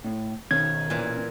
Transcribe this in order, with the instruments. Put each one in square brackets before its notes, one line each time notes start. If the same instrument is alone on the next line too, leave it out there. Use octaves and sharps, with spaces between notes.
[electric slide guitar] A2
[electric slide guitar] B2 C#4 [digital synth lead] D#3 [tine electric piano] G#6
[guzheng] A#2 E3